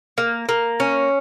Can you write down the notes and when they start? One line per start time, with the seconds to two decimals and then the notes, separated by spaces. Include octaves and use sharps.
0.18 A#3
0.49 A#3
0.80 C#4